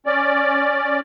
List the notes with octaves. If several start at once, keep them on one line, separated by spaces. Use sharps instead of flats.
C#4 D5